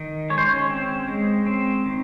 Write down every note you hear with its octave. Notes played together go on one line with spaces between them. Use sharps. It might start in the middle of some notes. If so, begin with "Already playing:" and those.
Already playing: D#3
G#3 C#5
C5
C#4 C#5
C4
G#3
C4
D#3